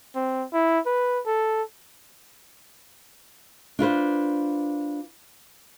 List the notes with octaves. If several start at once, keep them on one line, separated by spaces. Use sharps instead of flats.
C4
E4
B4
A4
D4 F4 B4 C5